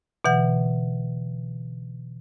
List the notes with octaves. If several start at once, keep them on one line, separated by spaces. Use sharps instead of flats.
B2 D3 E3 F#5